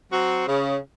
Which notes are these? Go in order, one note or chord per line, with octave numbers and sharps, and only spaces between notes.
F#3 C4 F#4
C#3